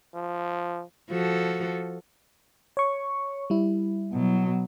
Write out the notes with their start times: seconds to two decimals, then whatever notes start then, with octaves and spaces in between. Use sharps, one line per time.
0.15 F3
1.10 F3 F#4 A4
2.77 C#5 C#6
3.50 G3 E4
4.13 B2 F#3